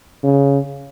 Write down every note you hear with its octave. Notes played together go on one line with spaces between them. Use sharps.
C#3